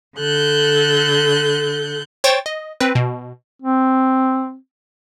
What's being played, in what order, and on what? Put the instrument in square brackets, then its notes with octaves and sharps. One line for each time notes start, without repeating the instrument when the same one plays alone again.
[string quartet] D3 A4 F#6 G6
[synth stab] C5 C#5 G5 C#6 A6
D#5
C4 B4
B2
[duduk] C4